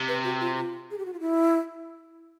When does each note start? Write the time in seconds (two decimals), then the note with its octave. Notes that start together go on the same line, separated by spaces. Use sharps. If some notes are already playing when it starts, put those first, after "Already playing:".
Already playing: C3
0.08 B4
0.24 F#4
0.41 F4
0.56 F4
0.91 G#4
0.98 G4
1.06 F#4
1.14 F4
1.20 E4